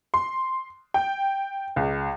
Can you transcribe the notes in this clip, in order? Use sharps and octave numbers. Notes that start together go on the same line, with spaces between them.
C6
G5
C#2